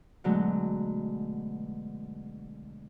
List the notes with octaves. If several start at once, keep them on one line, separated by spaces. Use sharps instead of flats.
B2 D3 F#3 G#3 A3